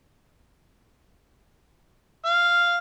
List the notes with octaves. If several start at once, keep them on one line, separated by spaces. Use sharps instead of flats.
F5